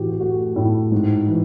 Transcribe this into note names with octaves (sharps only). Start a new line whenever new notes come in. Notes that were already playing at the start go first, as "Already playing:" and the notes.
Already playing: A2 E3 F#4 G4
G4
A3 F#4
A2
G#2
E3